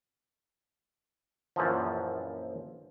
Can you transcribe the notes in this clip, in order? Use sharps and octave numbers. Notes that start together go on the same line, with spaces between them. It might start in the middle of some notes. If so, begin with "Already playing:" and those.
A#1 F#2 E3 F3